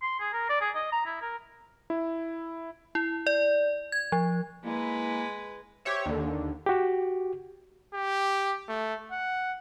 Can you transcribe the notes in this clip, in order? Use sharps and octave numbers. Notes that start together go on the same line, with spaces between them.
C6
G#4
A#4
D5
G#4
D#5
A#5
E4
A#4
E4
E4
D5
G#6
F3
G#3 A#3 E4 B4
G4 C5 C#5 E5
D#2 D3
F#4 G4
G4
A3
F#5